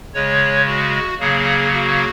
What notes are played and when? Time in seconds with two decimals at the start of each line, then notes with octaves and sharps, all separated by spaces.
0.14 C#3 G#3 C#5
0.67 F#4
1.20 C#3 F#3 A#3 G#4
1.73 F#4